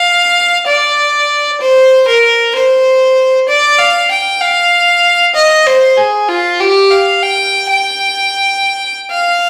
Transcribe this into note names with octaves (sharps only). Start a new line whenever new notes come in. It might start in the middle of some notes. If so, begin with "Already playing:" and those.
Already playing: F5
D5
C5
A#4
C5
D5
F5
G5
F5
D#5
C5
G#4
F4
G4
F5
G5
G5
F5